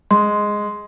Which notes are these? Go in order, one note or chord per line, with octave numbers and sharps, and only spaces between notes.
G#3 C6